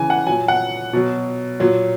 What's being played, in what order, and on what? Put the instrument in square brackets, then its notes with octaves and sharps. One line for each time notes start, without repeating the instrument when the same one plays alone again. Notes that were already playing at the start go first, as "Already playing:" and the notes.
Already playing: [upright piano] C#3 E3 G#5
F#5
F#3 G#5
A#2
F#5
B2 F#3
A#2 F#3